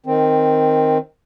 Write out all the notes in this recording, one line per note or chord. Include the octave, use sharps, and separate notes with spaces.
D#3 C4